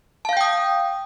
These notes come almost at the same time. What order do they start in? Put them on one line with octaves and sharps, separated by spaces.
A5 F5 G6 G5 D#6